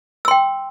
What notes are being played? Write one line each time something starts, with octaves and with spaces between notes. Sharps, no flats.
G5 C6 E6